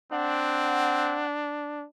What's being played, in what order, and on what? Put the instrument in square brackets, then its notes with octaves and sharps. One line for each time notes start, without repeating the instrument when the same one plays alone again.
[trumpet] C4 [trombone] D4 [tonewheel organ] F#5